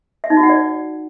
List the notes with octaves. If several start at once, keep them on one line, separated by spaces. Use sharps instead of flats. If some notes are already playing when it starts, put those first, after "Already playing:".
E5
D#4
F#4
F#5
D5